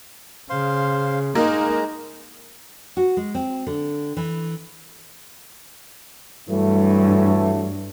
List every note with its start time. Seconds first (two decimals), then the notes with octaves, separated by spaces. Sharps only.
0.50 C#3 C5 F5 C6
1.35 G#3 A#3 D#4 A#5
2.97 F#4
3.17 G#3
3.35 C4
3.67 D3
4.17 E3
6.49 G2 E3 F#3 A3